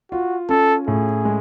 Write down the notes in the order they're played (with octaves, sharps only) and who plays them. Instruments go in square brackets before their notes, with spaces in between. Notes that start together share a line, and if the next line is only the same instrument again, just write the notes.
[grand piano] F4 [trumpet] F#4
[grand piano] C#4 [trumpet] A4
[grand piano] A2 [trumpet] G#4
[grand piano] G#3